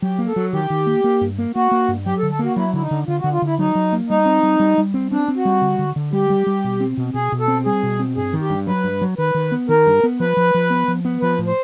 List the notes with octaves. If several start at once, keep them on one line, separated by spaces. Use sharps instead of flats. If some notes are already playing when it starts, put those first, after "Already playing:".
F#3 G4
A#3
A4
F#3
D#3 G4
D#3
A#3
A#3
G2
A#3
A#3 F#4
A#3
G2
F#3 G4
A4
D3
A4
A#3 F#4
F#3 E4
D3 E4
D#4
D3
D3 F4
D3 F#4
F4
D3 E4
F#3 D#4
F#3
A#3
G3 D#4
C4
G3
G3
G3
C4
C4 D4
C4
F#4
G3
D3
D3
D3
G3 G4
G3
G3
B2
C4
B2
B2 G#4
B2
A4
C4
G3 G#4
B2
C4
G2 G#4
D#3
G4
G2
F#3 B4
G2
F#3
D#3 B4
D#3
B3
D#3 A#4
G2
B3
F3 B4
F3
F3
B3
F3
B3
F3 B4
A2
C5